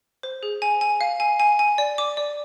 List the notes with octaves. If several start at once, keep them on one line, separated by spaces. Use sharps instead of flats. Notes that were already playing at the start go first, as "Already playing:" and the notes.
C5
G#4
G#5
G#5
F5
G#5
G#5
G#5
D5
D6
D5